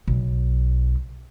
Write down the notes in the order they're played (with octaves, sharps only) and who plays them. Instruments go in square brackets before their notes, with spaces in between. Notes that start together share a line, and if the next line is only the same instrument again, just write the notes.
[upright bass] B1